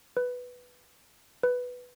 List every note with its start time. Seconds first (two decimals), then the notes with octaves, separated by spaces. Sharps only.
0.17 B4
1.43 B4